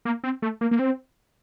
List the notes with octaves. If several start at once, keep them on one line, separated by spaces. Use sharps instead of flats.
A#3
C4
A3
A#3
A#3
C4